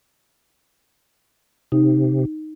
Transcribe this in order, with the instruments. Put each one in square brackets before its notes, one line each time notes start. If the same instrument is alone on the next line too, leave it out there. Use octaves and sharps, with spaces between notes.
[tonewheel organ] C3 [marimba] D#4